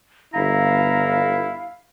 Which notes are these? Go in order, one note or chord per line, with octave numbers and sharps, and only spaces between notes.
G1 E4 F5 A#5